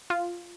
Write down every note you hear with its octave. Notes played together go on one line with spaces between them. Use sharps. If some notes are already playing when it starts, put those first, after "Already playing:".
F4